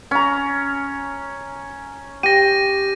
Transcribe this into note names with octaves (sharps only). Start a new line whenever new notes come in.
C#4 A#5
G4 A#6 D#7